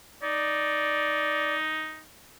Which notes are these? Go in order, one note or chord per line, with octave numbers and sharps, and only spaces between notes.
D#4 D5